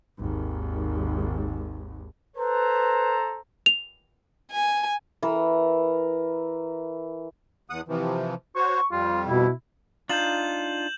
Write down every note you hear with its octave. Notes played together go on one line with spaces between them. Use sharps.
G#1 D#2
A4 B4 C5 A#5
F7
G#5
E3 A#4
E2 F#5 D#6
C3 E3 F3
F#4 C5 C#5 C#6
F2 G3 F4
B2 E4
D4 D#4 F4 G6 E7 F#7